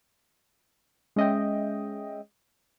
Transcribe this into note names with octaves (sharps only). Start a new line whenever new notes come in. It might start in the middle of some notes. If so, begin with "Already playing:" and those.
G#3 C#4 D#5 E5 G5